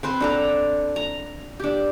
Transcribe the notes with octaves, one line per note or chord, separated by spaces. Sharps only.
C4 B4 C5
D4 A4 A#5
A#5
D4 G4